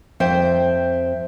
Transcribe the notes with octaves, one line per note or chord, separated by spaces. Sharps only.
F2 C5 E5 G5